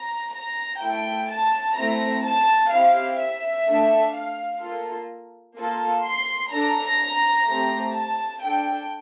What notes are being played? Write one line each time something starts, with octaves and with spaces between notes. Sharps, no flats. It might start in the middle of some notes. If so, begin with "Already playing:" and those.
Already playing: A#5
A#5
A3 E4 A4 G5
A5
A3 C4 E4 A#5
A5
C4 E4 G4 F5
E5
A3 D4 A4
F5
A#3 F4 A4
A#3 F4 A4
C6
D4 A4 A#5
A3 C4 G4
A5
D4 A4 G5